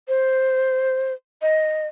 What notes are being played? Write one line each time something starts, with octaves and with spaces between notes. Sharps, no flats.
C5
D#5